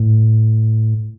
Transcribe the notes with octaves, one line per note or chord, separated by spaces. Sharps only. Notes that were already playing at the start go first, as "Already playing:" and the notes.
Already playing: A2